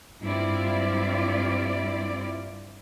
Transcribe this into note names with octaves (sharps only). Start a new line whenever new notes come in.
G2 C4 E4 F4 D5